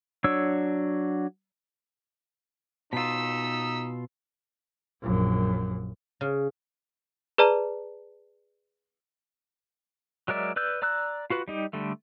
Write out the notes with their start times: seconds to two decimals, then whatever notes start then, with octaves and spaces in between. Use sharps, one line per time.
0.24 F#3 D4 C#5 E6
2.93 B2 D#4 F4 E6 B6
5.02 A#1 F#2
6.21 C#3
7.38 G#4 B4 D5 A5 A#5
10.28 F#3 G#3 A#4 D5 E5
10.56 B4 D5 E6 G6
10.82 D5 A#5 E6 F#6
11.30 F4 F#4 B4
11.48 G3 D#4 G4
11.73 D3 G3 A3